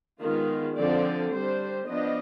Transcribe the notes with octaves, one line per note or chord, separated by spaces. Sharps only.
D#3 G#3 B3 F4
D3 F3 C4 D5
G3 D4 C5
F3 B3 D4 D#5